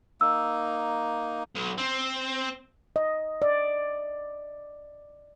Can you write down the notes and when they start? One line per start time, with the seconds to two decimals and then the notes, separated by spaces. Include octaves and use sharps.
0.21 A#3 D#4 E6
1.55 B1
1.78 C4
2.96 D#5
3.42 D5